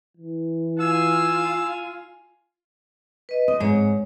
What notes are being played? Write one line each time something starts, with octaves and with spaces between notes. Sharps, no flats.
E3
F4 F5 G#5 E6
B4 D#5
C4 D#5
G#2 G#3 C#5